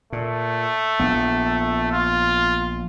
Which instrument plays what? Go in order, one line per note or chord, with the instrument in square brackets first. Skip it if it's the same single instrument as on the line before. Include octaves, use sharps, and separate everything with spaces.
[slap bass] A#2 [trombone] A3
[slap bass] A#1 B3
[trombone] F4